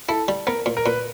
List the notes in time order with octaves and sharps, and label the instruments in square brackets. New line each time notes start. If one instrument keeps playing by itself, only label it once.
[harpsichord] E4 [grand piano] A4
[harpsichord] G3
[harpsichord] B3 [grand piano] A#4
[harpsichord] A#2
[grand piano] A#4
[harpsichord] A#2 [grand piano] B4